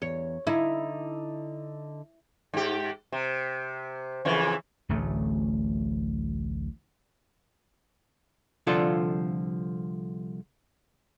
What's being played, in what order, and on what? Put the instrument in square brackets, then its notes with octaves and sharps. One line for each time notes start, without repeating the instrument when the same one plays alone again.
[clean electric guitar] E2 [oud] C#5
[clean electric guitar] D3 D#4 [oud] E4
[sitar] G#2 G4
C3
F2 C#3 E3
[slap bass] D1 A1 D2 A3
[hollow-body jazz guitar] C2 D3 F3 F4 A4